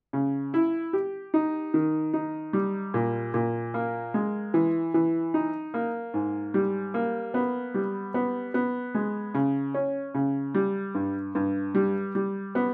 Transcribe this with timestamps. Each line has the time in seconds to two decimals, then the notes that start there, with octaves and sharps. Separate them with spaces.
0.13 C#3
0.54 E4
0.93 G4
1.34 D#4
1.74 D#3
2.13 D#4
2.53 G3
2.94 A#2
3.34 A#2
3.74 A#3
4.14 G#3
4.54 E3
4.94 E3
5.34 D#4
5.74 A#3
6.14 G#2
6.54 G3
6.94 A#3
7.34 B3
7.74 G3
8.14 B3
8.54 B3
8.95 G#3
9.34 C#3
9.74 C#4
10.14 C#3
10.55 G3
10.95 G2
11.35 G2
11.75 G3
12.15 G3
12.55 B3